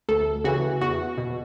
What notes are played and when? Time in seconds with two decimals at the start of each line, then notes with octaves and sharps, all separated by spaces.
0.09 D2 A4
0.44 C#3 E3 F#4
0.81 E2 F#4
1.18 B2